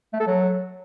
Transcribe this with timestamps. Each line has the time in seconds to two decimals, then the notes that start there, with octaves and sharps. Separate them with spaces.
0.13 A3
0.20 A4
0.27 F#3